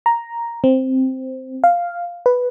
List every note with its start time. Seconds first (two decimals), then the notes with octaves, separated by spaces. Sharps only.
0.06 A#5
0.64 C4
1.64 F5
2.26 B4